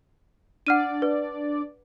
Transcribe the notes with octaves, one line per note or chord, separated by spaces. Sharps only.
D4 D5 F#5 F6 D#7
B4